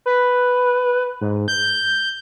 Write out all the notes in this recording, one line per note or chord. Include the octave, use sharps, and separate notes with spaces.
B4
G#2
G6